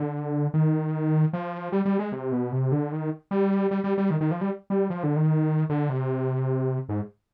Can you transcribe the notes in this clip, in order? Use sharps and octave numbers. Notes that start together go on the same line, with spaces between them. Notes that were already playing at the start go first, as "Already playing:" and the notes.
Already playing: D3
D#3
F3
G3
G3
G#3
C3
B2
C3
D3
D#3
G3
G3
G3
G3
D#3
D#3
F3
G3
G3
F3
D3
D#3
D3
C3
G#2